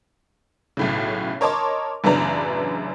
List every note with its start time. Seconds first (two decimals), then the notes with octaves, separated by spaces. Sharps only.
0.77 B1 A2 C#3
1.41 A#4 C#5 D#5 A5 C6 D6
2.04 A1 F#2 C#3 B3 D4 A#5